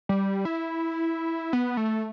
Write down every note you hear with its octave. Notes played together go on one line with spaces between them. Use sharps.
G3
E4
B3
A3